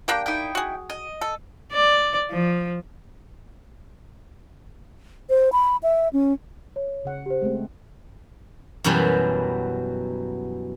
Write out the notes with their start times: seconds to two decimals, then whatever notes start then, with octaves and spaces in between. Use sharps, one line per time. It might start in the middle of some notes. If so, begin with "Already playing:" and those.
0.08 A#3 D4 G4 G5
0.26 D#4 E4 G5
0.55 F#4 G#4
0.90 D#5
1.21 A4
1.73 D5
2.31 F3
5.30 C5
5.52 B5
5.83 E5
6.13 C#4
6.76 C#5
7.05 C#3 F#5
7.26 G4 C5
7.42 G#3 A3 C4
8.84 F#2 B2 E3 F#3 G3